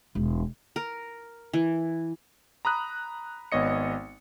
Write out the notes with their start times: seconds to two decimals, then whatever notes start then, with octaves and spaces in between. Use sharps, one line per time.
0.15 E1
0.76 A#4
1.53 E3
2.65 A#5 B5 D#6 F#6
3.52 G#1 B3 C#5 D#5 C#7